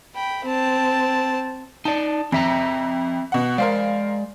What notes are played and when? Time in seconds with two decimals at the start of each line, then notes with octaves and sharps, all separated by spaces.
0.15 G5 B5
0.45 C4 A5
1.85 D#4 D5 A5
2.32 F2 C4 E5 A#5
3.32 B2 F#5
3.58 G#3 A#4 C5 D5 F5